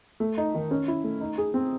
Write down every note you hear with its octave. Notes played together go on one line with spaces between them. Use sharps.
A3
D#4
D#3
C#4
E4
A3
D#4
G#4
C4